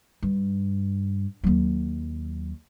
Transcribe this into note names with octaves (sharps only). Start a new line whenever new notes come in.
G2
D#2 F#3